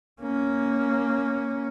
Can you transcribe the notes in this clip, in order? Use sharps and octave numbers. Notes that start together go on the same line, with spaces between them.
A#3 C#4